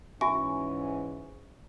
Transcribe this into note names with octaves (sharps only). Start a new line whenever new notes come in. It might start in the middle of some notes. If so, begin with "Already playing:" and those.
G#2 E3 C#4 F#4 E5 G#5 C#6